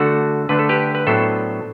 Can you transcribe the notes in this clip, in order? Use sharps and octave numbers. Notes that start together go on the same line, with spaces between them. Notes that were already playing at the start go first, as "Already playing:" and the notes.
Already playing: D3 A3 D4 F#4 A4
D3 A3 D4 B4
A4
G4 B4
B4
A2 F#3 B3 D4 A4 C5